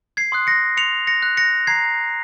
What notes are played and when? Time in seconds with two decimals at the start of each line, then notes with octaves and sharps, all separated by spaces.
0.17 G#6 C7
0.32 C6 D#6 F#6
0.47 A#6 C#7
0.77 C6 C#7 F7
1.07 A#6 C#7
1.23 F#6
1.37 A#6 C#7
1.67 A#5 G#6 C7